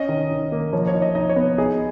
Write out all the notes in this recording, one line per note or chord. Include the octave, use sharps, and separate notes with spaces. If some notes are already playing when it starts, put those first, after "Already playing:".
Already playing: C#4 D#5
D#3
D#3
A#3
F3 C#5
C#5
D#4
D#5
D#4 D#5
C#5
B3
D#4 G#4